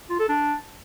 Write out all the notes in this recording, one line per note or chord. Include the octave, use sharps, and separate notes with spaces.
F4
A4
D4